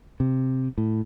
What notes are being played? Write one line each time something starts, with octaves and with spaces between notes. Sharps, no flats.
C3
A2